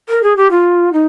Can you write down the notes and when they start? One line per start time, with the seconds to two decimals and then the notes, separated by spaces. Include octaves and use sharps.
0.08 A#4
0.22 G#4
0.36 G4
0.50 F4
0.92 D#4